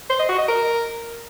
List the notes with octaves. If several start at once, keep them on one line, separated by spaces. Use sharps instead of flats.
C5
D#5
F#4
D#5
A#4